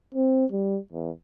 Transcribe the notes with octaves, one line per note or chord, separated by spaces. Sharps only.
C4
G3
E2